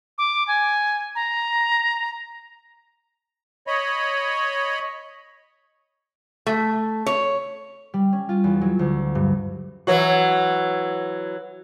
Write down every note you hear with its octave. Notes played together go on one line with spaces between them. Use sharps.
D6
G#5
A#5
C#5 D#5 B5
A3
C#5
G3
C#4
F4
E2
F#3
D2
G2
E3 F#3 F#4